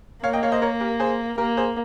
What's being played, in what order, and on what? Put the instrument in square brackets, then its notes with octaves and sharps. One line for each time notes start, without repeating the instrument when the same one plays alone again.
[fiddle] A#3 [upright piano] C#5 F5
[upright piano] D#5 G5
C#5 F5
C5 D#5
A#4 C#5
G4 A#4
G#4 C5
[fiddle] A#3 [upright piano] G4 A#4
[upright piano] G#4 C5